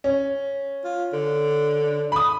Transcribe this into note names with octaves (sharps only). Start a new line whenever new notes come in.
C#4
F4
D3
B5 D#6